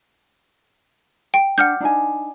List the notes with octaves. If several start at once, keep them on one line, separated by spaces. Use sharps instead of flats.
G5
D4 F#5 F6 G6
D4 D#4 G#5